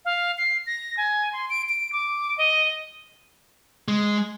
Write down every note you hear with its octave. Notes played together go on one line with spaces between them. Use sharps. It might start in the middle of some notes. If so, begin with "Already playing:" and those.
F5
C7
A#6
G#5
C6
D7
D7
D6
D#5
G#3